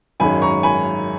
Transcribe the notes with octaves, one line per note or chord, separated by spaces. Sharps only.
G#1 F#2 D#3 G#3 C#4 G#5 B5
A#5 C#6
G#5 B5